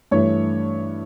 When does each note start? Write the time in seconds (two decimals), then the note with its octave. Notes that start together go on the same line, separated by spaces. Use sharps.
0.11 G2 E3 A3 C#5